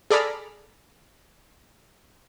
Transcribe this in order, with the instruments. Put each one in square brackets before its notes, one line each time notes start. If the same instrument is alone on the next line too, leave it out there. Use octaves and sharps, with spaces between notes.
[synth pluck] G#4 A4 D5 A#5 B5 F6